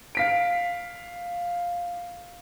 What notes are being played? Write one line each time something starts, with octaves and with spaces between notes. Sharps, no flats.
F5 B6 D7